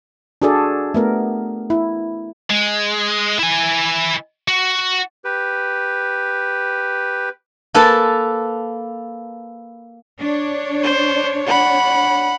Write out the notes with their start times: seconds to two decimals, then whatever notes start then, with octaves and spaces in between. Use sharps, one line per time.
0.42 D4 F#4 G#4 A4 D5
0.94 A3 B3 A#4
1.70 E4
2.50 G#3
3.39 E4 G#5
4.48 F#4
5.25 G4 B4
7.74 A#3 A4 B4 G#5 A5
10.21 D4 C#5
10.83 C5
11.46 F#5 B5